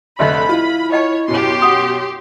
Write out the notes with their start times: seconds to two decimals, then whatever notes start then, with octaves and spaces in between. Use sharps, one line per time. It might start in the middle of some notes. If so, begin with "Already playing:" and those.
0.19 F1 A#1 D3 D#5 E5 B5 C6
0.49 E4 F4
0.92 C#5 D#5 G5 A5
1.28 F#2 B2 G4 C6
1.62 F#5 G5 D#6